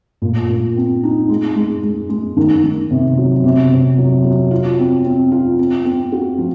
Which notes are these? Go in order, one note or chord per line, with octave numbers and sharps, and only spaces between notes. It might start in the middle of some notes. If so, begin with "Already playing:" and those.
A#2
A#2
C4
D#4
G#3
G#3
G#3
G#3
D#3
D#3
C3
F#3
C3
C3
F#3
F#3
F4
C4
C4
F4
C4
C4
F#4
F3